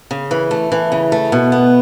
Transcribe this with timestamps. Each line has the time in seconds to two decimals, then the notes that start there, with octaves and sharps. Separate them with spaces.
0.11 C#3
0.31 E3
0.51 A3
0.72 E3
0.92 C#3
1.12 A3
1.32 B2
1.52 B3